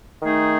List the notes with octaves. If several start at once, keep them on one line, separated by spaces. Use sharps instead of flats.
D#3 A3 D#4 G#4